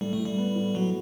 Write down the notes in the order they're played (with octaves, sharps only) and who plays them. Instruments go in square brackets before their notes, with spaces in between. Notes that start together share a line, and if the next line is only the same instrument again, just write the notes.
[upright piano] A2 [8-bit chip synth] G3
[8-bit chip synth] A3
[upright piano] A2
[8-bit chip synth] G3
[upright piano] B3
A2
[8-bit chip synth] F#3 [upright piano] F#4